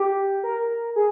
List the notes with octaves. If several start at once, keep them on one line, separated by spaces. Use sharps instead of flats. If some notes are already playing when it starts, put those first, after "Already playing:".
Already playing: G4
A#4
G#4